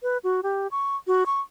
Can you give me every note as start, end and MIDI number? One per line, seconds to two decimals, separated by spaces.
0.03 0.18 71
0.24 0.41 66
0.43 0.67 67
0.71 0.96 85
1.07 1.24 66
1.26 1.41 85